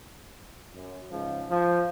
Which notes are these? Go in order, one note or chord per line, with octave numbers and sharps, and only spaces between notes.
F#2
C#2 G#2 F3
F3